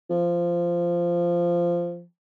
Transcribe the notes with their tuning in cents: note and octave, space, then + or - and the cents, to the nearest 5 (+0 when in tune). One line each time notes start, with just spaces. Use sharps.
F3 -10